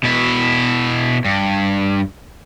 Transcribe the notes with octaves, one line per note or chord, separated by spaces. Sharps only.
B2 E4
G2